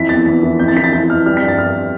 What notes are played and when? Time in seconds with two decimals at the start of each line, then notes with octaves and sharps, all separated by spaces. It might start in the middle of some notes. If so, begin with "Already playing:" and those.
Already playing: F2 E3 B6
0.09 E2 A6
0.27 E2
0.43 E3
0.59 F2 G6
0.68 A6
0.76 E3 B6
0.84 A6
0.92 E3 G6
1.09 F2 F6
1.26 G3 F6
1.37 B6
1.43 G2
1.48 A6
1.58 G2 F6